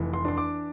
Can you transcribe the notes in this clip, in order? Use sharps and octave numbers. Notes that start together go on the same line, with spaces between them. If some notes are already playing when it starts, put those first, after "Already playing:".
Already playing: F1 E3
C6
D4 C6
D6